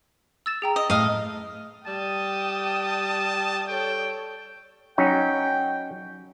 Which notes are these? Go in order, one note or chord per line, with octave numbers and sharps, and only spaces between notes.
E6 A6 E7
G#4 G5 A#5
D#5
A2 D#5 F5
G3 G5 A5 D#6
A4 C#5 G5
F#3 C#4 D#4 G5